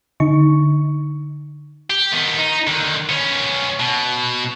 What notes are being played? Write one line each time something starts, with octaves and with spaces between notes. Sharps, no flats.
D3 D#4 C#6
G4
D#3 B3
D#4
D3 D#3
B3 C#4
B2